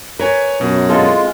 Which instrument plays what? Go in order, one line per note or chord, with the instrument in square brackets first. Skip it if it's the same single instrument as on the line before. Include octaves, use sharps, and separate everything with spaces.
[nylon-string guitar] A#4 [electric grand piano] B4 C#5 G#5
[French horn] F#2 [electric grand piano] B2
[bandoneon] G#3 F4 [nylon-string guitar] C4 E4 A4